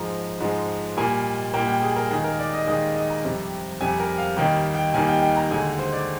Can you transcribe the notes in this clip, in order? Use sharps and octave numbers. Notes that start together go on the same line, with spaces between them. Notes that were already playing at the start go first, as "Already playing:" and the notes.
Already playing: G#2 F3 G#3 A#5
G#2 F3 G#3
A#2 G3 A#3 G#5
A#2 G3 A#3 G5
G5
G#4
A#4
D#2 D#3 G#3 G#4
A#4
D5
D#5
D#2 D#3 G#3 D#5
D#5
A#5
F2 C3 G3
F2 C3 G3 G#5
A#4
F5
D#2 D#3 G3 A#3 G5
G5
D#2 D#3 G3 A#3 G#5
G5
G5
A#5
D#2 D3 G#3 G#5
C5
D5